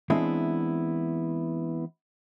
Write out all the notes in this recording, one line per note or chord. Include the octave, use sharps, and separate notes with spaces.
E3 G#3 B3 C4 D4 E4